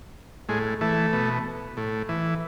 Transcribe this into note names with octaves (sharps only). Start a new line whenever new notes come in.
A2 G#3
E3 A3
B2
A2
E3